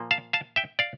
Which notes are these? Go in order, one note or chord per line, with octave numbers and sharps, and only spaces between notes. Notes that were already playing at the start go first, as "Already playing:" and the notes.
Already playing: A#2 F3 A#3
F5 A5
F5 A5
E5 G5
D5 F5